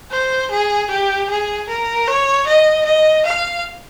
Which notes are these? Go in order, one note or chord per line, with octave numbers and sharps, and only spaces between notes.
C5
G#4
G4
G#4
A#4
C#5
D#5
D#5
F5